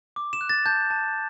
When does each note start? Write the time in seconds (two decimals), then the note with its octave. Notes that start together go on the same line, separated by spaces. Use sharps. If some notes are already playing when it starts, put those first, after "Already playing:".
0.16 D6
0.33 E7
0.41 F#6
0.49 A6
0.66 A5 G6
0.90 A5